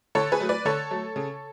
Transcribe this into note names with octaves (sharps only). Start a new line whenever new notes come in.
D3 A4 C#5
G#4 B4
F#3 A3
B4 D5
D3 A4 C#5
F#3 A3
C#3